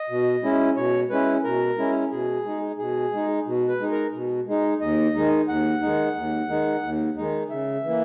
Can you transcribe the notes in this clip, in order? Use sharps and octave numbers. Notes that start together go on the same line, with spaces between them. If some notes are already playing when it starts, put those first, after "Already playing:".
Already playing: D#5
B2
G#3 C#4 E4
B2 C#5
G#3 C#4 E4 B4
B2 A#4
G#3 C#4 E4
B2 G#4
G#3 D#4
B2 G#4
G#3 D#4
B2
B4
G#3 D#4
A#4
B2
G#3 D#4
D#2 D#5
D#3 G#3 D#4
D#2 F#5
D#3 G#3 D#4
D#2
D#3 G#3 D#4
D#2
D#3 G#3 D#4
C#3 E5
E3 A#3